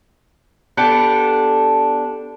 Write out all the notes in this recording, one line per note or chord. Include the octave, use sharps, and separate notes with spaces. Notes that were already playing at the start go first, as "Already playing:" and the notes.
B3 D4 G4 A4